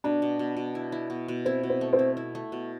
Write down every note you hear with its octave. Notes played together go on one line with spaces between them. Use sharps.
B2 D4
B2
B2
B2
E4
E4
B2
B2
C4 E4
B2
C4
A3
C4
E4
E4
A3
B2